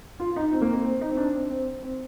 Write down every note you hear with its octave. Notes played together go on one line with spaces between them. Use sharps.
F4
D#4
C4
A#3
C4
C4
D#4
C4
D4
C4
C4
C4